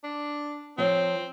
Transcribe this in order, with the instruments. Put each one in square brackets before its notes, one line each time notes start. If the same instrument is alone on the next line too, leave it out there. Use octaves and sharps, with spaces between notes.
[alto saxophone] D4
[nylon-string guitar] F3 C#5 [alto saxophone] C4